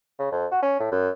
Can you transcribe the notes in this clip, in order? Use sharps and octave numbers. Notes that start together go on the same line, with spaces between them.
C#3
F2
F#4
C#4
A2
F#2